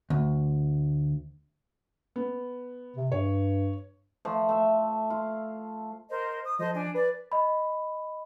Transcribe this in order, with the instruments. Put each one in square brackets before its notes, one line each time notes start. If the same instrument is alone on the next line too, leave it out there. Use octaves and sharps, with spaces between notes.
[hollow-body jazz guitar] D2
[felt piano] B3
[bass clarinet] C3
[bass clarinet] G2 [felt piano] C#5
[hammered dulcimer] F3 A3
A3 E5
F4
[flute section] A#4 C5 D#5
D#6
[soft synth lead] F3 [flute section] A4 C5 D#5
[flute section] D4 G#5
[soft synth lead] B4 [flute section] D5
[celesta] D#5 B5